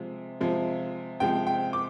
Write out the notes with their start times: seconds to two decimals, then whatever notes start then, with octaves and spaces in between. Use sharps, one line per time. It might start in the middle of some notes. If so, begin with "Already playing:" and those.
Already playing: C3 F3 G#3
0.41 C3 F3 G#3
1.20 C3 F3 G#3 G5
1.47 G5
1.73 D6